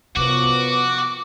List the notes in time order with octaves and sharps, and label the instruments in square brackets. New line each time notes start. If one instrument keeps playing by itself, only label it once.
[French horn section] F#2 F3 B3 [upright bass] C3 [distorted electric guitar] F#4 [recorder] D6